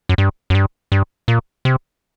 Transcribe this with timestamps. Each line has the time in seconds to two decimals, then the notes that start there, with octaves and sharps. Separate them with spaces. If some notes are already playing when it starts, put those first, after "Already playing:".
0.09 F#2
0.18 G2
0.50 F#2
0.55 G2
0.92 G2
1.28 A#2
1.65 C3